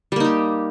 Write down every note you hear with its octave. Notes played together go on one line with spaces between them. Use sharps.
G3 A#3 D#4 G4